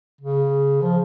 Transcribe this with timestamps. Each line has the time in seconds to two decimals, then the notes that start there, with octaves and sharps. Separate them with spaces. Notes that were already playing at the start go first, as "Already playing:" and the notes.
0.21 C#3
0.82 F3